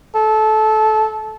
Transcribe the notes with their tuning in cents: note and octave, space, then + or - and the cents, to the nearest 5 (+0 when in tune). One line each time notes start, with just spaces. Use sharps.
A4 -20